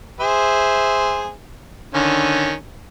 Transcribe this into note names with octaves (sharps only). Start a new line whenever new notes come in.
G#4 C5 E5
D3 D#3 C#4